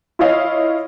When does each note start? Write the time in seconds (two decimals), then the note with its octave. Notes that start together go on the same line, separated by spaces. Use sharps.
0.19 E4 F4 C#5 D#5 F5